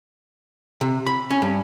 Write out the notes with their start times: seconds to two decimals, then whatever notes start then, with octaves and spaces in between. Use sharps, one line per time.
0.81 C3
1.07 B5
1.31 C#4
1.42 G2